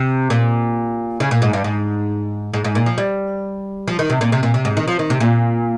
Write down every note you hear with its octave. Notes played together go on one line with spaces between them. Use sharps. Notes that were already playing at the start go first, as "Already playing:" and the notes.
Already playing: C3
A#2
C#3
A#2
G#2
G2
G#2
G#2
G#2
A#2
F3
G3
F3
D#3
C3
A#2
C3
A#2
C3
G#2
D#3
F3
D#3
C3
A#2